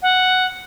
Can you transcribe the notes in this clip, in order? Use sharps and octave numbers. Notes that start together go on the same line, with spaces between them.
F#5